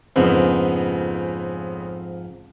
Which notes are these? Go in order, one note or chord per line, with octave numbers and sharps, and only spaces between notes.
F2 G#2 C#3 F3 B3 C4